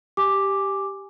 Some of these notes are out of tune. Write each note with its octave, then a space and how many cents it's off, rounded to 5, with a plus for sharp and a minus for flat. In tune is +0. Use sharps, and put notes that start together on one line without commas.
G4 +0 G#5 -5 D6 +0